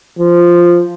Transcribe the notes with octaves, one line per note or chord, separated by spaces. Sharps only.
F3